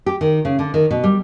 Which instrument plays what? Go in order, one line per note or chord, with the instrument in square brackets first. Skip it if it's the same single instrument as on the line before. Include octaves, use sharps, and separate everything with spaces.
[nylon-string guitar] G4
D#3
C#3
D3
D#3
B2
G3